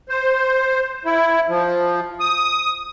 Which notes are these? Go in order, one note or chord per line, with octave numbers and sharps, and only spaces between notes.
C5
E4
F3
D#6